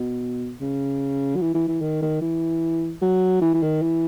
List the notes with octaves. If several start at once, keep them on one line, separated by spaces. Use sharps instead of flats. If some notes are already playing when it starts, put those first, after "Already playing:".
Already playing: B2
C#3
F#3
E3
E3
E3
D#3
D#3
E3
F#3
E3
E3
D#3
E3